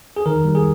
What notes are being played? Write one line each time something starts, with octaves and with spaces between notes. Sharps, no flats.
G#4
D#3 A#4
G3
G#4